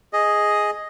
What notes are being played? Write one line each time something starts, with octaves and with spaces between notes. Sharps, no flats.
G#4 D#5